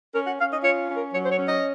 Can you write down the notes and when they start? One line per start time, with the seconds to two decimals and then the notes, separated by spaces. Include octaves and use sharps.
0.15 C#4 A#4
0.27 F#5
0.40 C#4 F5
0.52 D#5
0.64 F4 C#5
0.89 C#4
0.97 A#4
1.13 F#3 C#5
1.24 C5
1.30 C#5
1.38 C#4
1.46 D#5